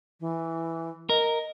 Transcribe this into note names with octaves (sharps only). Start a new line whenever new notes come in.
E3
A#4 D#5